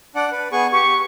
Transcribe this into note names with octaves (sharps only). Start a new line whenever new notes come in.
D4 D5 F#5
B4
B3 G#4 C#6
G4 C#6